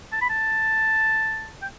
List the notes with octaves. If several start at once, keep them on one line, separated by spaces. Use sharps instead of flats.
A5
B5
A5
G5